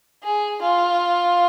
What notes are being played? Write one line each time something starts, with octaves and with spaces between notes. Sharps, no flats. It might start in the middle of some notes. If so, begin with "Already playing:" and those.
G#4
F4